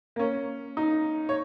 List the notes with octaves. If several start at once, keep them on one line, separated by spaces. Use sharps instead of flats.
A#3
C#4
D#4
C#5